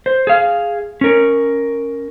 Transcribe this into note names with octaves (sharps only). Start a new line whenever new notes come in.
C5
G#4 F5
C#4 A#4